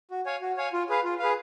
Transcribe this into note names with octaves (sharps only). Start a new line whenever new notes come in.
F#4
C#5 F5 G#5
F#4
C#5 F5 G#5
F4
G#4 B4 F5
F4
G#4 B4 F5